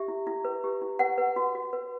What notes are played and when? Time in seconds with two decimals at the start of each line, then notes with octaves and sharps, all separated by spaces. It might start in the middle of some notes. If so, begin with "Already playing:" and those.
Already playing: G4 E5
0.08 E4
0.27 E4
0.45 B4
0.64 G4
0.82 E4
0.99 B4 F#5
1.18 B4
1.36 F#4
1.55 F#4
1.73 B4